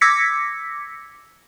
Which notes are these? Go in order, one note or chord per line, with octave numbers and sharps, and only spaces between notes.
D6 E6 G#6 A#6 B6 C#7